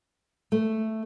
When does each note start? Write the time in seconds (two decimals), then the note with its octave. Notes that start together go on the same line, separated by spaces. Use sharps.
0.52 A3